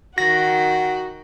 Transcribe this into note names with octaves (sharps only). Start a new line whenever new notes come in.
D#3 F#4 F#5 G5 A#6